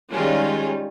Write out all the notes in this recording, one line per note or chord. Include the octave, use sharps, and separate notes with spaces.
D#3 G3 G#3 C#4 D#4 F4